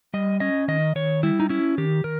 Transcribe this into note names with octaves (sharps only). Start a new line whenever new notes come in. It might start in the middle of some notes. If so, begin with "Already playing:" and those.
G3 D#5
C#4 D#5
D#3 D#5
D#3 C#5
G3 E4
D#4
C#4 E4
D#3 G4
D#3 A#4